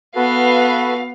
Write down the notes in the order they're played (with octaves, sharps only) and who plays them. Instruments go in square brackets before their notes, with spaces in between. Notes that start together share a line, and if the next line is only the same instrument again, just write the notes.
[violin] B3 F5 [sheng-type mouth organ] F#4 A4 B4